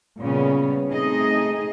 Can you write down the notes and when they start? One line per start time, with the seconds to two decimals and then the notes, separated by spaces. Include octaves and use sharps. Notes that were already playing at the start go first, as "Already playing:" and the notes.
0.20 A#2 C#3 G3 B3 C#4
0.89 A3 C4 D#4 G#4 D#5